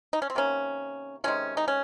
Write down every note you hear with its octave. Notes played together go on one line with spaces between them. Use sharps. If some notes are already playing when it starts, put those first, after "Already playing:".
D#4
C#4
C4
C3 D#3 A#3 C#4
C3 D#3 G#3 C#4
D#4
C#4